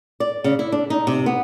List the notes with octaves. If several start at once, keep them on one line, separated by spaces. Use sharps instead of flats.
D5
C#3
E4
D4
D#4
C3
B3